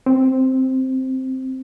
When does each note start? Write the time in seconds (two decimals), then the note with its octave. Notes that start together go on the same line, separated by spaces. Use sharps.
0.06 C4